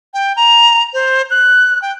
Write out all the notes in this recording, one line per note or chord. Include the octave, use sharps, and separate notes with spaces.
G5
A#5
C5
F#6
G5